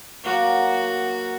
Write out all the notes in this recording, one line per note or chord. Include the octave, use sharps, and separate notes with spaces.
F#3 A#3 F#4 A#4